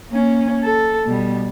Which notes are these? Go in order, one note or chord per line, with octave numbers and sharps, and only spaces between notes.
A#3 C#4
A4
B2 G3